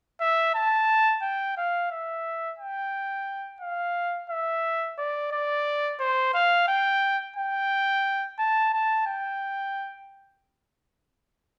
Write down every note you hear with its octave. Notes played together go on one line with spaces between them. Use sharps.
E5
A5
G5
F5
E5
G5
F5
E5
D5
D5
C5
F5
G5
G5
A5
A5
G5